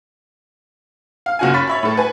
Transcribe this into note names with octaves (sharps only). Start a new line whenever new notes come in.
F5
F#1 C#4 F#4 F5 G#5
B5 C#6 A6 B6
C#5 E5 B5
A2 A4
B4 G#5